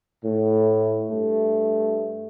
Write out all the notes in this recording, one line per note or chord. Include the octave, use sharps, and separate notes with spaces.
A2
G2 A3